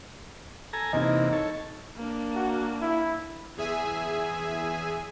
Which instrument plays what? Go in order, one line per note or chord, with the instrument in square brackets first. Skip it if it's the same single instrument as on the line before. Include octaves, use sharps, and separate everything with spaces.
[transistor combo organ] A4 G#5 A#5
[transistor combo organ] E2 C3 A#3 [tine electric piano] D#4 D#5
[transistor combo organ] A4 C#5
[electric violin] A#3 D4
[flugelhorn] F#4
E4
[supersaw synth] E2 G#4 E5 G#5